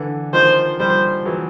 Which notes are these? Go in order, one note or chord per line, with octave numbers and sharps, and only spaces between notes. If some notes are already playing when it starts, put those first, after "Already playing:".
Already playing: D3 E3
D#3 F3 C5
F3 G3 C5
E3 F#3